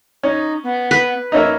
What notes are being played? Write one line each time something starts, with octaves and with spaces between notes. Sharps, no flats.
C#4 D#4
B3
B4
A#3 C#4 D#4 E5